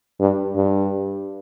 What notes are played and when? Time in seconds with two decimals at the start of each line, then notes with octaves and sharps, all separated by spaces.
0.20 G2
0.56 G2